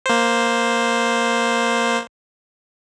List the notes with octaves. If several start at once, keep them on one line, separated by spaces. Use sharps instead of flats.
A#3 C5